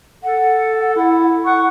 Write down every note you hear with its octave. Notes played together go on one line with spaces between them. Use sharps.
A4 F#5
E4
F#5 C#6